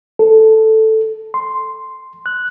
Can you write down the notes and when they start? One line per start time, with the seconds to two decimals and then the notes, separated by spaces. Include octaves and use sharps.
0.19 A4
1.34 C6
2.26 F#6